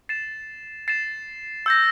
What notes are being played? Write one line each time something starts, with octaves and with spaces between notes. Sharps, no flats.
A6 C7 E7
A6 C7 E7
E6 G6 A#6